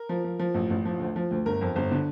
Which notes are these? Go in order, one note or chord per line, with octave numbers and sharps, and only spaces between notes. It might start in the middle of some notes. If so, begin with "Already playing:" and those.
Already playing: A#4
F3
F3
F3
A1
A1
F3
D2
F3
D2
G1 A#4
F2
G1 C5
D3